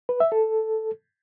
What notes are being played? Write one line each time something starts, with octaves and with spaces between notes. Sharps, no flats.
B4
E5
A4